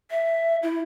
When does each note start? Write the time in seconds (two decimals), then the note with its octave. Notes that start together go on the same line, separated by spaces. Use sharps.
0.11 E5
0.63 E4